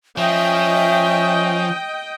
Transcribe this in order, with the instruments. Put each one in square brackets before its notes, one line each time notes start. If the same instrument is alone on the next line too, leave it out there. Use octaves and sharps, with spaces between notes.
[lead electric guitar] F3 [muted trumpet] C#4 [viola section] D#5 G5 [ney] E5